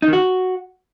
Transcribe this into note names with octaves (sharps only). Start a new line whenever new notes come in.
D#4
D#3
F#4